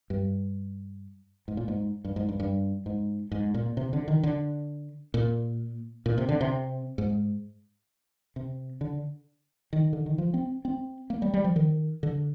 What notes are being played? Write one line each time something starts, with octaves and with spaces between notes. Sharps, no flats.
G2
G#2
A#2
G#2
G2
G#2
G2
G2
G#2
G#2
A#2
C3
D3
D#3
D3
A#2
A#2
C3
D3
C3
G#2
C3
D3
D#3
D3
D#3
F3
C4
C4
A#3
G3
G3
F3
D#3
D3